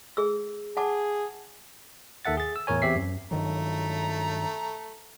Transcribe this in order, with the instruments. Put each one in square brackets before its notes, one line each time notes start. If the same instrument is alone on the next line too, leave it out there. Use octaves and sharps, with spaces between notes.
[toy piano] G#4 E6
[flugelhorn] G#4 [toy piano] F#5 A5 D6
[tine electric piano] D#2 D#3 A4 E5 F#5 A6
G#4 A6
E6
E2 A2 A#4 C#5 G#5
E2 C4 G4 E5 B6 C7
F#2
[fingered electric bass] G2 D#3 F#3 [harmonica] A3 A#5